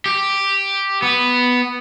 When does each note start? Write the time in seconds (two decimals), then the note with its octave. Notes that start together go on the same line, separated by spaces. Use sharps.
0.06 G4
1.02 B3